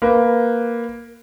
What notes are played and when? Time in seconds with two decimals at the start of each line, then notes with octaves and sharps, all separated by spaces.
0.02 A#3 B4